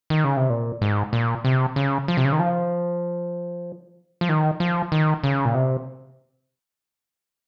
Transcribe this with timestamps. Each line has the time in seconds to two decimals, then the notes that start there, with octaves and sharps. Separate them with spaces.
0.10 D#3
0.24 C#3
0.37 C3
0.50 A#2
0.81 G#2
1.13 A#2
1.44 C3
1.76 C#3
2.08 F3
2.17 C3
2.25 C#3
2.32 D#3
2.39 F3
4.21 F3
4.29 D#3
4.60 F3
4.92 D#3
5.23 C#3
5.45 A#2
5.55 C3